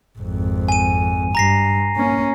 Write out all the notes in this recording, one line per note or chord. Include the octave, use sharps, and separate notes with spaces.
G#1 F2
G#5 D#7
G2 A#5 A#6 C7
A#3 C#4